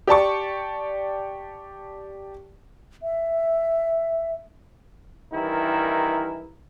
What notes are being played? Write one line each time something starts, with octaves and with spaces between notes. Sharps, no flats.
G4 D5 A5 C#6
E5
G2 D#3 E3 E4 A#4